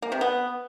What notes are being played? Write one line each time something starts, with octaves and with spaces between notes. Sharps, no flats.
A#3
C3
B3